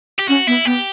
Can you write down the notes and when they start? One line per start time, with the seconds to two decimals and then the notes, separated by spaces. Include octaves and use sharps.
0.19 G4
0.28 C#4 F#4
0.47 B3 E4
0.65 B3 G4